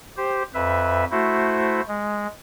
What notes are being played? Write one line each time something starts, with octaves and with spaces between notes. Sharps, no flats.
G4 C5
F2 B4 E5
A3 E4 F#4 C5
G#3